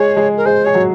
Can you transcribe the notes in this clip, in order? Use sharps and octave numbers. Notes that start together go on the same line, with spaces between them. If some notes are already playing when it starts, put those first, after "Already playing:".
Already playing: G#3 G#4 C#5
G#3 G#4
A#4
G#3 G#4 C5
G#4 C#5
F#3 F#4